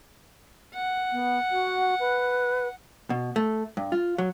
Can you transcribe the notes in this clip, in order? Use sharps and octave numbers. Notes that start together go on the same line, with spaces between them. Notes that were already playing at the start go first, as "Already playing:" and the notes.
F#5
B3
F#4
B4
B2
A3
G2
F4
F#3